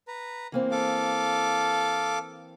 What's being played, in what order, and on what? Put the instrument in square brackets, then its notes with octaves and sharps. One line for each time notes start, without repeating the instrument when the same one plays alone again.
[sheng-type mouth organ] B4 A#5
[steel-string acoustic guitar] E3 A#3 C4
[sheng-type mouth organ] A4 F5 D6